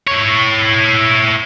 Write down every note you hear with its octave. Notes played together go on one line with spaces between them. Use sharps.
E4 C#5